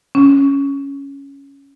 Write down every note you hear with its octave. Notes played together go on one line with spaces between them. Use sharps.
C#4